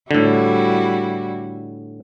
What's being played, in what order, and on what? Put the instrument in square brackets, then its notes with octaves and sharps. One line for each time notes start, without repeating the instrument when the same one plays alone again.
[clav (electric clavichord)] A2 D3 [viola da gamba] G3 E4 F#4